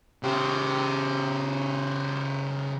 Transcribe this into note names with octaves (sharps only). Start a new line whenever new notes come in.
C#3 G4